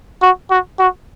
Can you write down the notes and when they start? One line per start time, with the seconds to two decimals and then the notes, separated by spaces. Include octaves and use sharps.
0.22 F#4
0.50 F#4
0.79 F#4